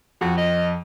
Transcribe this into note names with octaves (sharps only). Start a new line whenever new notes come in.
F2 F#4
D#5